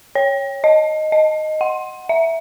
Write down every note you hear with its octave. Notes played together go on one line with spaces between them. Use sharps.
C#5
D#5
D#5
F#5
E5